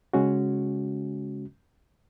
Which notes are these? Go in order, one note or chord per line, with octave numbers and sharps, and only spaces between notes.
C#3 G#3 C#4 F#4